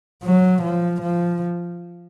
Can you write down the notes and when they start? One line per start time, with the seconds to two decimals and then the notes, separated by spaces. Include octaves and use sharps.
0.23 F#3
0.62 F3
1.02 F3